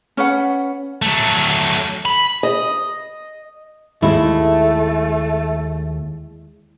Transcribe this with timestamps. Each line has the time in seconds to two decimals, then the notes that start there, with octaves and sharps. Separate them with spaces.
0.17 C#4 B4 F#5
1.02 F#3 A3
2.05 B5
2.43 D#5
4.02 D#2 G#3 A3 E4